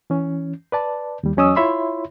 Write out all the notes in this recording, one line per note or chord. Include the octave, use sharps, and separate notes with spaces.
E3 C#4
B4 D5 A5
D#2 G3
E2 F#3 C#4 D#5 D#6 E6
E4 F4 C#5 E5 B5 C6